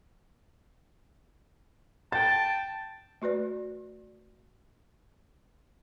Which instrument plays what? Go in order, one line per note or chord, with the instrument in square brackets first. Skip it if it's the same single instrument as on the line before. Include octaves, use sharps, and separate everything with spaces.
[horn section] G5 A5 [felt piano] A6
[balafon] A3 F#4 B4 D5